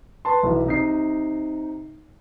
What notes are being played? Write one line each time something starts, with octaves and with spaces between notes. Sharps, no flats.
B4 A5 C6
B1 E3
C3 D#4 C7